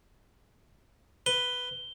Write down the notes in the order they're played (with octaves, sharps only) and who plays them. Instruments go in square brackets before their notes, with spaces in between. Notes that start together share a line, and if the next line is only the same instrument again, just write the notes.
[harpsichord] B4 [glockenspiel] G7